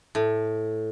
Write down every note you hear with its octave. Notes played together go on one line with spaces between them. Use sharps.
A2